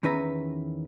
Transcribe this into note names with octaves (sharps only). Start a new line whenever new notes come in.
E2 D#3 C#4 B4 E5 A#5